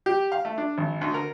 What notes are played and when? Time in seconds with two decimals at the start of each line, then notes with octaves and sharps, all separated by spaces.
0.06 G4
0.32 F5
0.45 A3
0.58 D4
0.78 G#1
1.01 D2
1.14 A#4